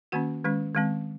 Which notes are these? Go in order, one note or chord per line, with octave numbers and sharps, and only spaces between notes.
D#3 A#3 C#4 F#4 F#5
D#3 G#3 C#4
D#3 G#3 C4